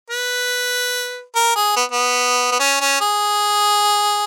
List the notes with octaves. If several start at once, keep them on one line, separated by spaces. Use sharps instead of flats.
B4
A#4
G#4
B3
B3
B3
C#4
C#4
G#4